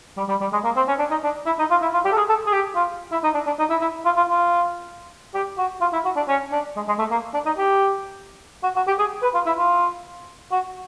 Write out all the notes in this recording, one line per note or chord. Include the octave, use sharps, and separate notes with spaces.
G3
G3
G3
G#3
A#3
C4
C#4
D4
D#4
D4
E4
D#4
F4
E4
F4
G4
A4
G#4
A4
G#4
G4
F4
E4
D#4
D4
D4
D#4
E4
E4
F4
F4
F4
G4
F#4
F4
E4
F#4
D4
C#4
D4
G#3
G#3
A3
A#3
D4
D#4
G4
F#4
F#4
G4
G#4
B4
F4
E4
F4
F#4